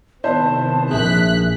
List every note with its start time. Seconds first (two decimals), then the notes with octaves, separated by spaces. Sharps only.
0.24 C3 D#3 B3 C4 E4 C5 A5
0.91 A#1 A#2 G#4 E5 F#6 B6